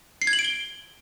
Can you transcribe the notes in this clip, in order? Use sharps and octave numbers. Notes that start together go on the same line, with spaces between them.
C7
G#6
F#7
D7
G7